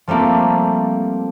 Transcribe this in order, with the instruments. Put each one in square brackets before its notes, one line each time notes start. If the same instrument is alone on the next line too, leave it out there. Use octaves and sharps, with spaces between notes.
[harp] F3 G3 A3 A#3 C4